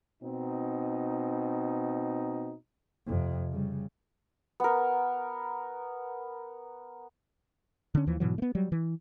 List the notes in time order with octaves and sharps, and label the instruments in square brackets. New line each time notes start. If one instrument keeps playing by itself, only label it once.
[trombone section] B2 C4 D#4
[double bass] F2 C3
C#3 G3
[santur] B3 A#4
[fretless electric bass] D3 C#4
D#2 E3 F3
G#2 B2 E3 F#3
A3 B3
F#3 G3
E3